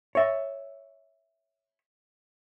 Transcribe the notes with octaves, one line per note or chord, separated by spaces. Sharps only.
C#5 E5